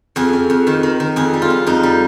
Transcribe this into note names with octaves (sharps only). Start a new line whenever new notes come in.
F2 G#4
F2
F2
D#3
D#3
D#3
F2 G#4
G3
F4
F2
F2 D#4
G3